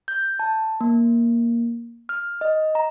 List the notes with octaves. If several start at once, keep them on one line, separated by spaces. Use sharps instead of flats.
G6
A5
A#3
F6
D#5
A#5